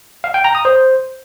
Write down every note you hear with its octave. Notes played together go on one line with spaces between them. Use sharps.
F5
G5
A#5
D#6
C5